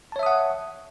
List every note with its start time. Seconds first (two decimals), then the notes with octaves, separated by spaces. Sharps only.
0.12 A5
0.16 C#5
0.19 E5
0.23 D#6
0.26 F#5